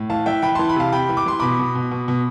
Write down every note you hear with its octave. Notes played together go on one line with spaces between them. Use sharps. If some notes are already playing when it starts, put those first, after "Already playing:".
Already playing: A2
E3 F5 A5
E3 E5 G5
E3 G5 B5
E3 A5 C6
B5
C3 F5 A5
C3 G5 B5
E3
D6
E3 C6
B2 B5 D6
B2
B2
B2
B2